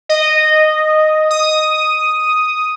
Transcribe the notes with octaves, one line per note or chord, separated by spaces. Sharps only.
D#5
D#6